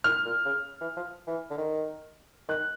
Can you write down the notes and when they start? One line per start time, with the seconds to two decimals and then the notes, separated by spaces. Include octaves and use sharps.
0.04 A#2 F6
0.25 A#2
0.45 C#3
0.81 E3
0.97 F3
1.27 E3
1.50 D3
1.58 D#3
2.49 D#3 F#6